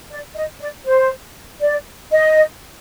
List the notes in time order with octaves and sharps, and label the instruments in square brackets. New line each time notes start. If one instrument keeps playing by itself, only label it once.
[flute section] D5
D#5
D5
C5
D5
D#5